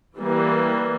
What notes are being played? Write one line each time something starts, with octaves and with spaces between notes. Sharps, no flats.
E3 G3 A#3